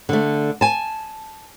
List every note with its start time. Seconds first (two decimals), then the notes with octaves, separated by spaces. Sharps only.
0.09 D3 A3
0.61 G#5 A5